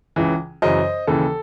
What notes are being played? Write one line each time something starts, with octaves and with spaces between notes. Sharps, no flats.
C#2 C#3 E3
F#2 C#3 E3 C5 D#5
D#2 C#3 E3 A4